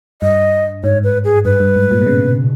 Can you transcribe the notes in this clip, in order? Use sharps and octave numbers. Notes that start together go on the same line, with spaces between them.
G2 D#5
G#2 C#5
B4
G#4
G2 B4
G2
G#2
A#2
B2
C#3